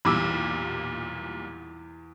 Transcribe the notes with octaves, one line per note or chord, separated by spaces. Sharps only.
B1 E2 A#2 G3 B5 D6 E6